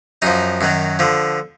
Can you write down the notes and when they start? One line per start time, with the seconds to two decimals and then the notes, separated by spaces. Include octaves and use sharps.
0.22 F#2 F3 D#4
0.61 F#2 D#3 F#3
0.99 D3 F3